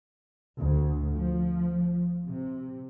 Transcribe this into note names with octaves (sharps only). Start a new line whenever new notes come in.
D2
F3
C3